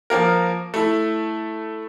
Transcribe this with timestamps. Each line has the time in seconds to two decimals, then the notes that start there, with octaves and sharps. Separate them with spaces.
0.10 F3 A#3 A#4
0.74 A3 E4